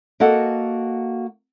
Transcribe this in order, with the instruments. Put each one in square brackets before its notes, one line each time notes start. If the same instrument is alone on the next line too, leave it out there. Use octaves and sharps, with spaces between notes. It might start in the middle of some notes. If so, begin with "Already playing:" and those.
[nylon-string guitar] A#3 F#4 A4 D#5 F#5